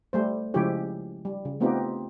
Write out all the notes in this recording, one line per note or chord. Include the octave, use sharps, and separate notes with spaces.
G3 A3 C5
C#3 F3 G#3 E4 G4 C#5
G3
C#3
A3 B3 C4 D#4 F4 G4